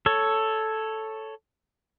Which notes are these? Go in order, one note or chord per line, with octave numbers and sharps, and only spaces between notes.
A4 C#5